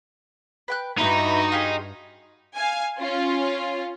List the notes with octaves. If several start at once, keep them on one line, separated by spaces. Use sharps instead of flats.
B4 G5 F#6
G2 D#4 E4 F#4 B4 E5 A#5
F4 G4 G#4
F5 G#5
C#4 F4